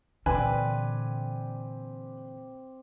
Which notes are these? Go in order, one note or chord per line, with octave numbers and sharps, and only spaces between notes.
A#2 D3 E3 C4 D4 G4 B4 G#5